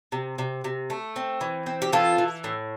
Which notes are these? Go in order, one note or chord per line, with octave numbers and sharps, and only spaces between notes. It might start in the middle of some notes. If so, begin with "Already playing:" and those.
C3
C3
C3
A3
C4
E3
C4
G4
E3 F4 A4
E3
A2